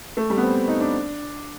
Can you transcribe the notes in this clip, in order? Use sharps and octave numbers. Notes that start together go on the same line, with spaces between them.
A3
G3
B3
C4
D#4
D4